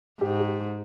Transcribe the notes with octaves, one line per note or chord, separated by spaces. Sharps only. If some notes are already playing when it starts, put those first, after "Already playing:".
G#2 G4
G4